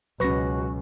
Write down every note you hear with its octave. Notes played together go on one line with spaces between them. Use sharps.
C#2 B2 F#3 C#4 F#4 B4 C#6 A#6